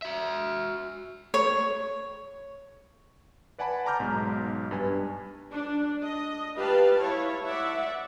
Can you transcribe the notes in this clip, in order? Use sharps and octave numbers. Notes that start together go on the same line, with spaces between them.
F#4 E5
C#5
B4 D5 F#5 G#5 A5 B5
A5 A#5 D6 F6 G6
B1 G#2 B2
G2 B4 G#5
D4
D#5
G4 B4 F5 A5
E4 C#5
D5 E5 F#5